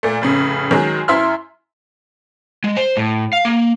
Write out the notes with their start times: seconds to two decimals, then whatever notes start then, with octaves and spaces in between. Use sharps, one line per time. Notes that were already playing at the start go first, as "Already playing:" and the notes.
0.03 A#2 A3
0.21 F1 A2 C#3
0.71 D#3 F#3 G#3
1.08 F#2 E4 E5 C6 F6
2.64 G#3
2.77 C5
2.97 A2
3.33 F5
3.45 A#3